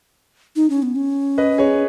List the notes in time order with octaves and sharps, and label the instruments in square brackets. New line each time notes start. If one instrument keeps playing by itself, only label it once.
[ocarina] D#4
C#4
B3
C#4
[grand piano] B4 D#5
G#4 C#5